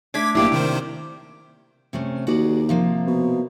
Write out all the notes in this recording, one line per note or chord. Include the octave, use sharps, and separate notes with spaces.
A3 D4 D6 G#6 B6
B1 A2 A#3 E4 G4 D5
C3 D#3 C5
C3 A3 C#4
D#2 F#4 G#4 D5
C3 F3 A#3
B2